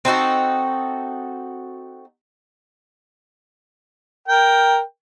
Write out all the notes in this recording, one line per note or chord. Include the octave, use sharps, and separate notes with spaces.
C4 D#4 F#4 A4
A#4 G5